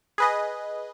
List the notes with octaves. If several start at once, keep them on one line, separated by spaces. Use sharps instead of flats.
G#4 B4 D#5